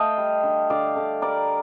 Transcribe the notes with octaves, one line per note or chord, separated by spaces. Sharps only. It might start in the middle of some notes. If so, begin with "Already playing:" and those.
Already playing: A3 D#5 F5 G5 A5
G3
D3
D3 D5 F5
D3
G3 A#4 D5